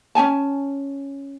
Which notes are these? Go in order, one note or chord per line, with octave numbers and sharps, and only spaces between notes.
C#4 D#4 G#5 A5